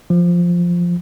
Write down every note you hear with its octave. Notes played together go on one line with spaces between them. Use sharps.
F3